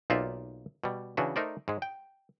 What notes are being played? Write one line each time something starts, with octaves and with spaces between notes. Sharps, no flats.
B1 A#3 D#4 F4 D5 E5
B2 G3
C#3 E3 D4 F#4 B4
A3 D#4 A#4 C5 D5
G#2 G#3
G5